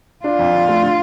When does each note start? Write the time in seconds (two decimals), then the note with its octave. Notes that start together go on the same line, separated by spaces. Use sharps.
0.24 D4 F4
0.39 F2
0.53 D3
0.68 A3
0.83 D3